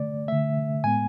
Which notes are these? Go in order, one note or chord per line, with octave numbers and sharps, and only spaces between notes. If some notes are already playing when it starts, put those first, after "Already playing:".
Already playing: D3 A3 D5
D3 A3 E5
A2 G#3 B3 G#5